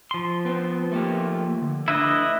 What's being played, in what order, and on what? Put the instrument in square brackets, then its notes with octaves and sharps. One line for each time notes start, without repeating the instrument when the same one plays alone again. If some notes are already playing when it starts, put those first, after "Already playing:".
[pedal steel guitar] F3 C6
[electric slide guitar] B3 C4
A3 A#3 G4
D3
[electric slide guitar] A3 D4 E5 [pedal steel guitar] E4 B4 D#5